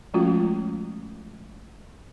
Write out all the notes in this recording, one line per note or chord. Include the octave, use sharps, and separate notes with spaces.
F3 G#3 A3 C#4 F4 F#4